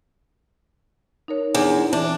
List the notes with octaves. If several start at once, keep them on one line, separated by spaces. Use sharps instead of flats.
D#4 A#4 C#5
E2 D4
E3 D4